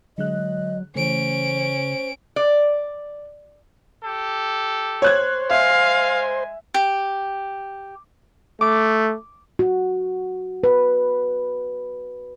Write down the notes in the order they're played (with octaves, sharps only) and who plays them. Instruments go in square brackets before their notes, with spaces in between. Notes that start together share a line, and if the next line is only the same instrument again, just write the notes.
[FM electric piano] D3 G#3 F#6 [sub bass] F#3 [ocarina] D#5
[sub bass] C#3 [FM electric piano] E3 A3 [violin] C#4 D7 [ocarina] C5
[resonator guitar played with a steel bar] D5
[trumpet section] G4 A4
[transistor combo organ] C5 [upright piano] C#5 F#6 G#6
[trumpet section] G#3 G#5 [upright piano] E5 [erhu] F5
[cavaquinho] G4
[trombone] A3 [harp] D6
[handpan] F#4
B4